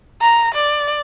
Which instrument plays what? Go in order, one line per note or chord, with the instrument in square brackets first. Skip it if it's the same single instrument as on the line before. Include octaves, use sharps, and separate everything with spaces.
[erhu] A#5
D5